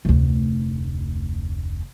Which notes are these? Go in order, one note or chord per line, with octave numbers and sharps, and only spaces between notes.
F1 D2